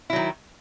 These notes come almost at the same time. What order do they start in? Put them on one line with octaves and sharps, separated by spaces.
E4 F#3 D#3